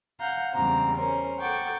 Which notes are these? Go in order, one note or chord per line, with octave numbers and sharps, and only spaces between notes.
F5 F#5 A#5 G6
E2 C#3 G3 C4 C5 A#5
C#4 A#4 C5
A4 F#5 G5 C#6 D6